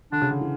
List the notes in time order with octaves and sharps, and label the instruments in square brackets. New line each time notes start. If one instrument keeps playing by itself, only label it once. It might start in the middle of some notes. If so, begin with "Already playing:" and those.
[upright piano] D3 [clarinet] D4
[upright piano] C#3
D3
E3